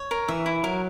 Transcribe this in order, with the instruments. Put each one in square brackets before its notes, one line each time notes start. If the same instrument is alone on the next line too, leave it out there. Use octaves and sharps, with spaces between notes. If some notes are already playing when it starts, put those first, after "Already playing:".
Already playing: [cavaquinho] C#5
A#4
[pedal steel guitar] E3 [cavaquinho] E5
[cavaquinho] E4
[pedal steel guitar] F#3 [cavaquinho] A#4